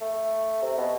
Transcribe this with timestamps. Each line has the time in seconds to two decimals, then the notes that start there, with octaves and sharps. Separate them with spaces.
0.01 A3
0.62 C3
0.77 B2